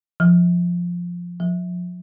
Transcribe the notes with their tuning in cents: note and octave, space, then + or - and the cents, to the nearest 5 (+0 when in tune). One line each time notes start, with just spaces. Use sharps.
F3 +5
F3 +35